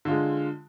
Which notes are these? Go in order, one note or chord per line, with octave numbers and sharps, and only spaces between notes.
D3 G#3 F4